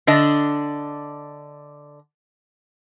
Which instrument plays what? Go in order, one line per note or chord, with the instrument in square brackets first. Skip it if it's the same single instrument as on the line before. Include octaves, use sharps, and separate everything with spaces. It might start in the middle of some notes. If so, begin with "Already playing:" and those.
[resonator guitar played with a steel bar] D3 D4 D#5